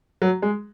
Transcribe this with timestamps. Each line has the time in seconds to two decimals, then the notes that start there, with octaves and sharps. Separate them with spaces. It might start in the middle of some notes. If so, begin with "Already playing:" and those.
0.22 F#3
0.42 G#3